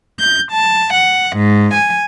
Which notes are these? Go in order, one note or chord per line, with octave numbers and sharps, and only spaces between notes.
G6
A5
F#5
G#2
G#5